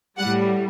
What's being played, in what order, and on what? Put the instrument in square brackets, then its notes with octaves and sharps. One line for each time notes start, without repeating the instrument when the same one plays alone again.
[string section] A2 G3 F#5